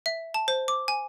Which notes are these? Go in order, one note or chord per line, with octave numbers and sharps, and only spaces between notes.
E5
A5
C5
D6
G#5